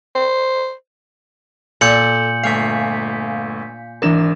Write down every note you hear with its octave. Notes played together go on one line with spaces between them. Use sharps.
C5
A#2 A4 G6 C#7 F#7
G1 A3 F5 G#5 B6 C7
G#1 E3 D4 A#4 E7